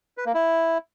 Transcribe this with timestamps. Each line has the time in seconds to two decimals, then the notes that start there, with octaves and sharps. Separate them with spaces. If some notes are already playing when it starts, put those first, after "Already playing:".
0.17 B4
0.26 A#3
0.35 E4